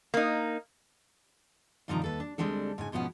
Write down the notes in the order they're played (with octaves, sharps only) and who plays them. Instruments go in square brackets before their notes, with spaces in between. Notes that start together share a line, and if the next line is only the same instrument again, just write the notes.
[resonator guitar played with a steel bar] A#3 D#4
[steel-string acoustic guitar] D2 G2 C3 D#3 F3 A#5
D#2 A4 B4
D4
D2 G3 G#3 C4 D4 A4
G#2 C#3 G#5
G#2 B2 F3 A3 B3 C#4